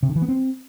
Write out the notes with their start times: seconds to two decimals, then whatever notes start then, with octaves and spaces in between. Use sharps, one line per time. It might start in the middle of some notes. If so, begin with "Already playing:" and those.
0.03 C3
0.09 D3
0.16 E3
0.22 B3
0.28 C4